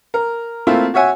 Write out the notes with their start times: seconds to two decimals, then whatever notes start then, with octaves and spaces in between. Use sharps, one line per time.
0.14 A#4
0.67 A3 A#3 C4 E4 F4
0.94 F#4 C#5 E5 F#5 G#5